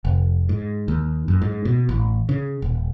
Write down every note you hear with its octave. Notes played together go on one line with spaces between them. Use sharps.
F1
G#2
D#2
F#2
G#2
B2
A1
C#3
D#1